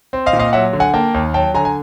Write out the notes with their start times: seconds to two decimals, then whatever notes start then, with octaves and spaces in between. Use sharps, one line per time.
0.13 C4
0.26 D#5 F5
0.33 A#2
0.39 D#5 F5
0.53 F#3 E5 F#5
0.73 D3
0.80 F#5 G#5
0.94 A#3 G5 A5
1.14 D#2
1.34 F#3 G5 A5
1.54 D3 G#5 A#5
1.65 G#5